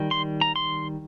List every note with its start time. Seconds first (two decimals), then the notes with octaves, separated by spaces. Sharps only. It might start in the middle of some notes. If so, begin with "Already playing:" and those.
Already playing: D#3 G3
0.11 C6
0.41 A#5
0.56 C6